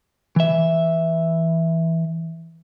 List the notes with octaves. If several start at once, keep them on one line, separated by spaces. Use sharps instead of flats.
E3 E5